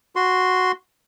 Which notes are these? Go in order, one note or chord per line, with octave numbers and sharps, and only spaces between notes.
F#4 C6